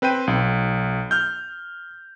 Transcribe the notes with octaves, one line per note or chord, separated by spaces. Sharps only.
C4 B4 C5 G5 D#7
B1
F6 G6